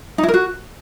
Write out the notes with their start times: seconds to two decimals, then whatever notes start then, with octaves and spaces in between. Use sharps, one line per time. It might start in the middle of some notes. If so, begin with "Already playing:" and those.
0.18 D#4
0.23 E4
0.29 A#4
0.34 F#4